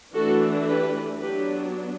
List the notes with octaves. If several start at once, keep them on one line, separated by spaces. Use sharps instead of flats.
E3 A3 D4 F#4 A4
G4 B4
F#3 B3 D4 G4 B4